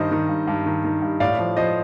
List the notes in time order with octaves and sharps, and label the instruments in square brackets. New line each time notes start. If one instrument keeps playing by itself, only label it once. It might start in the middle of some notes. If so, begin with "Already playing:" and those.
Already playing: [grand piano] G2 D#3 C5 D#5
D#3
G2
G2
D#3
D#3
G2
A2 D5 F5
F3
F3 C5 D#5